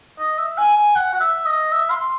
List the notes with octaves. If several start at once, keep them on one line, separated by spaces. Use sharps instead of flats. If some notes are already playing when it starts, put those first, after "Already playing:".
D#5
E5
G#5
G#5
F#5
F#5
E5
D#5
E5
C6